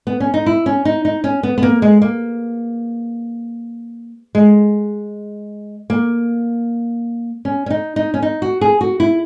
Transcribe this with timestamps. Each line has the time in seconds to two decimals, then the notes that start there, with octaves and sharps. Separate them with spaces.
0.07 B3
0.20 C#4
0.34 D#4
0.46 E4
0.66 C#4
0.85 D#4
1.05 D#4
1.24 C#4
1.43 B3
1.58 B3
1.63 A#3
1.82 G#3
2.02 A#3
4.35 G#3
5.90 A#3
7.45 C#4
7.66 C#4
7.71 D#4
7.96 D#4
8.14 C#4
8.22 D#4
8.42 F#4
8.61 G#4
8.81 F#4
9.00 E4